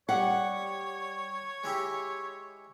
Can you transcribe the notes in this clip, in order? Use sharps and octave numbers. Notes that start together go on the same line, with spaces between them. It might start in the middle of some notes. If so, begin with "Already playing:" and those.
G3 C#5 F#5
G#3 E4 G4